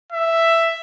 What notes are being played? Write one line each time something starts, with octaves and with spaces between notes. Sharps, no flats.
E5